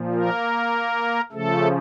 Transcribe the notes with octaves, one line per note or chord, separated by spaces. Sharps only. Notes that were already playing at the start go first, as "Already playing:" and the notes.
Already playing: A#2 F3
A#3 A#4
C#3 F3 A3 A4